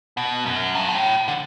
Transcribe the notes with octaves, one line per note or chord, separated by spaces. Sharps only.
B2
F#2
G2
B2
A2
D3